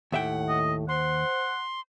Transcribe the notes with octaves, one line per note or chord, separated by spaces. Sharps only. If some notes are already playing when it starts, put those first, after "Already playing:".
D#2 A2 E5 F#5 G5
D#5
C5 F#5 C6